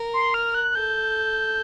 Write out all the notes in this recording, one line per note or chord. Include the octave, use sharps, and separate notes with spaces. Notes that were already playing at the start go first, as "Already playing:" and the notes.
Already playing: A#4
C6
F6
F#6
A4 G6